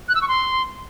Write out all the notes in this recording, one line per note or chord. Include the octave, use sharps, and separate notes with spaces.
F#6
E6
C#6
C6